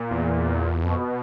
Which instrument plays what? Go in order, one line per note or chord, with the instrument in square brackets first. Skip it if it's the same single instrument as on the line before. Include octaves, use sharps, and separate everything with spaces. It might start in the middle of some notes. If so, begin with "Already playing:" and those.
Already playing: [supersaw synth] A#2
[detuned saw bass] E2
[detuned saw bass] F2 [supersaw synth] B2